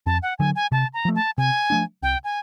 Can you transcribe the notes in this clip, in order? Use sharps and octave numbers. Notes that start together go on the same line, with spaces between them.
F2 A5
F#5
D3 F#3 G#5
G#5
C3 A5
A#5
F3 A3
A5
C3 G#5
F3 A3 D4
C2 G5
G#5